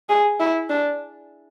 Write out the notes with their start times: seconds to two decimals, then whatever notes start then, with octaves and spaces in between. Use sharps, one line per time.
0.09 G#4
0.40 E4
0.70 D4